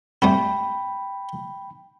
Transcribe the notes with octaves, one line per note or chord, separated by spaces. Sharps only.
G3 A3 C4 G5 B5